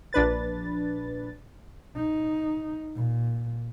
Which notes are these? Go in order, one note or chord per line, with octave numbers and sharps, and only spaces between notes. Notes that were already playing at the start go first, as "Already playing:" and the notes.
A#1 D4 B4 A6
D#4
A#2